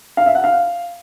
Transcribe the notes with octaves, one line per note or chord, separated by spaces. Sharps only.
F5
E5
F#5
F5